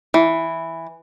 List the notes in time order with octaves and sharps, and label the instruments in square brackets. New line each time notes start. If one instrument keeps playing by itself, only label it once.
[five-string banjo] E3